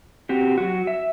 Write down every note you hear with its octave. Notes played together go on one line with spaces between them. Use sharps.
C4 F#4 G4
F#3 F#4
E5